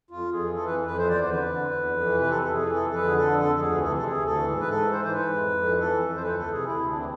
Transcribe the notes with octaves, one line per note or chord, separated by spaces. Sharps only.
F2 F4
F2
G#4
E3
E3 A4
F2 B4
F2 B4
E2 C5
E2 D5
C5
D3 B4
D3
E2
E2
F2
E3
C3
B4
F2 A4
F2 A4
G#4
E3
F2 A4
F2 A4
B4
D3 G#4
D3 A4
F2
A4
F2
A4
D2 G#4
E3
A4
C3
A4
D2 G#4
D2
A4
E3
G#2
G#2 B4
A4
E3
E3 C5
G#2 C5
B4
G#2
F2
F2
E3
E3 A4
F2
F2
C5
D2 B4
E3 A4
C3 G#4
D2 E4
D2
D4
E3 C4